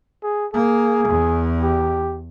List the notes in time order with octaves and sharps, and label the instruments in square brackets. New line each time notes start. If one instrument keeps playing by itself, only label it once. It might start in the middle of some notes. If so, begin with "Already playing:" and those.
[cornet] G#4
[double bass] A#3 [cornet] G#4
[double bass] E2
[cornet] G4